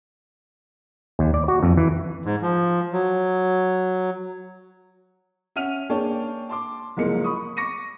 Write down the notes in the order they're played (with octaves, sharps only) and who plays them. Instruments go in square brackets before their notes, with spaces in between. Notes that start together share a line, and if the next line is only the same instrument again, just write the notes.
[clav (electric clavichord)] D#2
D5
F#4
F2
E3
[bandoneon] G#2
F3
F#3
[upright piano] C#4 E5 F#5 F6 D#7 F7
A#3 D4 G#4 C#5 G5 A5
A5 C6 D6
F#1 C2 F3 G#3 A#3 C#7
B5 C#6 D#6
C#6 D6 A#6 C#7 D#7